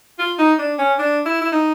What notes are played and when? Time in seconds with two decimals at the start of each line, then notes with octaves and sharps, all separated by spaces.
0.19 F4
0.39 D#4
0.59 D4
0.79 C#4
0.99 D4
1.26 E4
1.42 E4
1.52 D#4